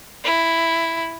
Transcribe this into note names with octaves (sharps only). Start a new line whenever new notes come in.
E4